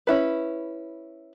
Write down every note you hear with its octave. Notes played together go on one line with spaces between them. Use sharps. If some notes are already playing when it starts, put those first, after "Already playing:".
C#4 E4 B4